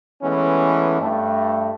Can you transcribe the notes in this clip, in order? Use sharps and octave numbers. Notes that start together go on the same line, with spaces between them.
E3 G#3 A3 B3 C#4
G2 A3